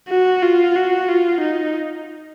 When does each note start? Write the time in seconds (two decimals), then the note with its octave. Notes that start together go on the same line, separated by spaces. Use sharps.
0.09 F#4
0.43 F4
0.76 F#4
1.09 F4
1.41 D#4